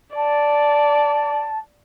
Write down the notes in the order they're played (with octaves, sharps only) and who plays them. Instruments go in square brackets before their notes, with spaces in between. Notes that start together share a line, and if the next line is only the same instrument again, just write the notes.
[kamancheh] D5 [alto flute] A5